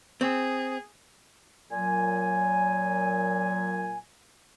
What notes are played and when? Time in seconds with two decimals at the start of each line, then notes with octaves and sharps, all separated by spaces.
0.21 C4 G#4
1.71 A#2 F#3 G#5